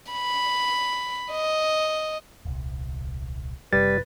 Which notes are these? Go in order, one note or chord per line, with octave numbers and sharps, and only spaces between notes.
B5
D#5
D#1 C2
F#1 C3 G3 B4 A6